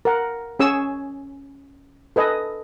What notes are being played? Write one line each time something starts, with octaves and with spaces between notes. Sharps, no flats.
A#4 F#5
C#4 G#4 C#5 G#5 E6
A4 B4 D#5 G#5